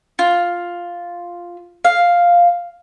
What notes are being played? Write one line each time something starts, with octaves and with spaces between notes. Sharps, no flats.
F4
F5